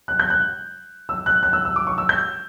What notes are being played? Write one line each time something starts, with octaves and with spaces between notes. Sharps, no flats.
F#6
G6
F#6
E6
F#6
F#6
E6
E6
D6
C#6
E6
G6